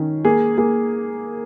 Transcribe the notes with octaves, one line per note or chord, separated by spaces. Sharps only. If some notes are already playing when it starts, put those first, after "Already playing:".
Already playing: D#3 C#4
A#3 G#4
A#3 G#4